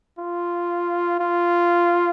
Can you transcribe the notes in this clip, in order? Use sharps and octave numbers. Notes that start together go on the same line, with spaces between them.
F4
F4